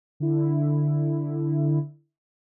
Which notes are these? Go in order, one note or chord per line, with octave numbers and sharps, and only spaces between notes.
D3 E4